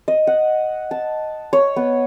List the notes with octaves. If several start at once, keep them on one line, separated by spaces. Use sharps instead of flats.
D#5
F#5
A5
C#5
B3